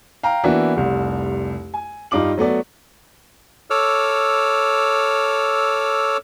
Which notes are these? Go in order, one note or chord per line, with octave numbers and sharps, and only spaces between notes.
F5 G5 A#5
E3 A#3 B3 D4 E4 F#4
F1 C2
G#5
G2 D#4 F4 D6 F#7
F#3 A3 B3 D5
A4 C#5 D6 E6 F6